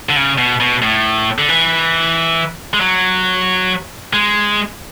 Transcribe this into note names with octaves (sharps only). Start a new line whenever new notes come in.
D3
C#3
B2
B2
A2
D3
E3
G#3
F#3
G#3